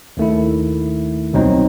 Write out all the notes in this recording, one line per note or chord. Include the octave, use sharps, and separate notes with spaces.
D#2 D#3 A3 E4
C2 B2 F#3 C4 D#4